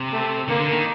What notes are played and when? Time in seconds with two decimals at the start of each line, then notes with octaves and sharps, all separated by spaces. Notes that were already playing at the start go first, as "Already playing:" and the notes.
Already playing: C3
0.12 A3
0.48 D3 A#3
0.60 D3
0.72 D#3